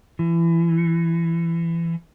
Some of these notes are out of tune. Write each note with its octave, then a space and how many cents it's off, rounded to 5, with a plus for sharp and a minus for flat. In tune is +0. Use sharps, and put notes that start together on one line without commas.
E3 +25